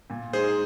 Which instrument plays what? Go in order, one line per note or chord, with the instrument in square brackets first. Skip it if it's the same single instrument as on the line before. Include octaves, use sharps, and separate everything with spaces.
[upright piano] A#2
[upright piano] G#3 D#4 [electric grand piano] G#4 C5